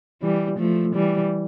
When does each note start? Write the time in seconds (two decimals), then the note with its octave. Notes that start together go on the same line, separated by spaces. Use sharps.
0.22 E3 G3
0.58 F3 A3
0.95 E3 G3